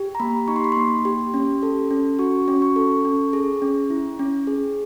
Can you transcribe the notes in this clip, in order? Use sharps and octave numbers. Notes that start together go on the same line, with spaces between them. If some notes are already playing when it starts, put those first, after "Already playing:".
Already playing: G4
A#5
A#3 B5
D#4 C#6
C6
B5
A#3 C6
G4
C#4
A4
C#4
F#4 C#6
C#4
C#6
A4
C#4
G#4
C#4
E4
C#4
G#4